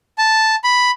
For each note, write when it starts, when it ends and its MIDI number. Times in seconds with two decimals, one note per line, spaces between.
0.18 0.55 81
0.64 0.91 83